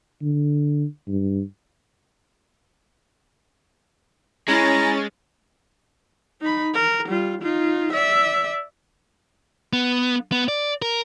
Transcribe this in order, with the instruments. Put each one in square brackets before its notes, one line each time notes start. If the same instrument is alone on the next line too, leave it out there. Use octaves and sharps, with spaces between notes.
[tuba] D3
G2
[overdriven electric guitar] G#3 [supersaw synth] C#4 A6 [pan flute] E4 [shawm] A#5
[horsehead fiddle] D#4 B5
A#4
G3 F4
D#4 F4
D5 E5
[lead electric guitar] B3
B3
D5
A#4